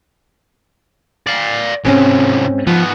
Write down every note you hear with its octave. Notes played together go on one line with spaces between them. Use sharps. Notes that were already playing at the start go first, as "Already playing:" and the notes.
D5 F5
G#2 C3 G#3 C4 C#4
G#2 F3 B3